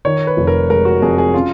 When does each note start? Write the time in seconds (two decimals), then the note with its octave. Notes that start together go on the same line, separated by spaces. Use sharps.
0.05 D#3 C#5
0.27 B4
0.37 F1
0.47 A#4
0.70 G#3 A#4
0.85 F#4
1.02 F2 G#4
1.18 G#4
1.34 C#4 F4